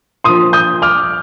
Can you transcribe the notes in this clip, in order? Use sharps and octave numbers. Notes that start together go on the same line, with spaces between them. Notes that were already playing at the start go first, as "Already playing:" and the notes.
A#2 F3 C6 D#6
D#6 G6
D6 F6